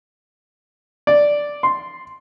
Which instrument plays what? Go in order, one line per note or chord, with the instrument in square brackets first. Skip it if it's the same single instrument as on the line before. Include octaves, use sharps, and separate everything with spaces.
[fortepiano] D5
C6